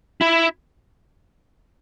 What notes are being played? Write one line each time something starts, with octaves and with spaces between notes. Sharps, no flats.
E4